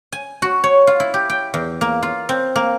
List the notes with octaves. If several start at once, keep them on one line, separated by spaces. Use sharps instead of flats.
G#5
F#4
C#5
F4
E4
G4
G5
E2
A#3
F4
C4
A#3